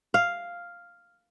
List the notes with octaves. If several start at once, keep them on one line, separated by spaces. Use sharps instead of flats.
F5